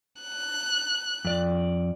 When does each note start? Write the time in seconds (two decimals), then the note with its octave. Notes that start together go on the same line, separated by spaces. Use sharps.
0.21 F#6
1.25 F2 D5